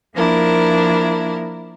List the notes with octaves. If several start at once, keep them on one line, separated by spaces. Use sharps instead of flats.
F3 A#3 D4 E4 A#4